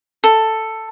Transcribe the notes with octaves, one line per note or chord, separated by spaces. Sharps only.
A4